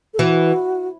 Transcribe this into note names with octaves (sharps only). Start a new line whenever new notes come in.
A4
E3 F#4